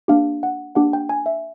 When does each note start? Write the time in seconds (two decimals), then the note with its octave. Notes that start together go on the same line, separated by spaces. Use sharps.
0.08 A#3 D4 G4 F5
0.43 F#5
0.75 A#3 D4 G4 F#5
0.93 G5
1.09 G#5
1.26 E5